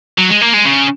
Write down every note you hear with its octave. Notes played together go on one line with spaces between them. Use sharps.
F#3
G#3
A#3
G#3
C#3